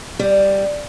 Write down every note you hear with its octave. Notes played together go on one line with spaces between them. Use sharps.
G3